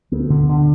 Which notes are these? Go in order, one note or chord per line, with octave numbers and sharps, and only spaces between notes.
D2 B3
D3
D3